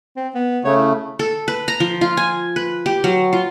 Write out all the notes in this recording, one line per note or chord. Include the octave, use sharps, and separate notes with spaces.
C4
B3
C#3 A3 C#5
E4
A4
B4
A#5
F3
F4
G#5
B4
G4
F#3
F4